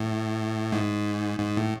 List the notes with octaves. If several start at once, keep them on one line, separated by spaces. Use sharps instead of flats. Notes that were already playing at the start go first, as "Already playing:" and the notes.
Already playing: A2
G#2
G#2
A2